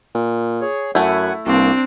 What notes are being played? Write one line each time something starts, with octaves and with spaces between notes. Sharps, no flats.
A#2
G#4 C#5
F#2 A3 E4 F#5 G#5
C2 G2 A#3 C4 D4